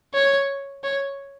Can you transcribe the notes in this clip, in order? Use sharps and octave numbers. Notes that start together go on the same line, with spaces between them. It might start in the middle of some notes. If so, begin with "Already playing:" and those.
C#5
C#5